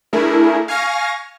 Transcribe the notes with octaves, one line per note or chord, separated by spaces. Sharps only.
A3 D4 E4 G#4 A#4
F5 G#5 C#6 F6 A#6